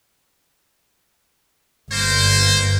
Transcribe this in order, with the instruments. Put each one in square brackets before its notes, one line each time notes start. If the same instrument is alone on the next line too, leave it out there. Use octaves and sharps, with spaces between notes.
[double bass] G1 G2 [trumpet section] A#3 C5